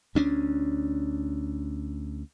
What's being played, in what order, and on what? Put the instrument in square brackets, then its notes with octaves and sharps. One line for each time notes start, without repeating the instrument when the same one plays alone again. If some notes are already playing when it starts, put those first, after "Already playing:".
[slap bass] D2 C#4 D4